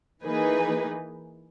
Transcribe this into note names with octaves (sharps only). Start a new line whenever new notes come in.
E3 A#3 D#4 G#4 B4